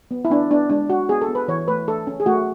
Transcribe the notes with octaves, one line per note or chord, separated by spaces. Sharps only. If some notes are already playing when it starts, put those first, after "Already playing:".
B3
E4
B3 D4
B3 D4
G#3 D4
G#3 F#4
B3 G#4
A4
B3
B4
E3 C#5
A3 B4
A3 A4
C#4
G#4
A3 F#4